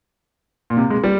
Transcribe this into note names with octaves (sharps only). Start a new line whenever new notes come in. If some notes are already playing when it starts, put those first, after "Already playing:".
A#2
C3
G#3
G3